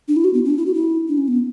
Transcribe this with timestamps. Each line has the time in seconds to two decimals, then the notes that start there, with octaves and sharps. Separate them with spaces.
0.08 D4
0.17 E4
0.24 F#4
0.34 B3
0.45 C#4
0.50 D4
0.58 E4
0.66 F#4
0.74 E4
1.08 D4
1.18 C#4
1.28 B3